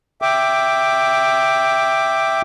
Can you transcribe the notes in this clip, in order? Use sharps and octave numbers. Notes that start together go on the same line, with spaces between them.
E5 G5 D6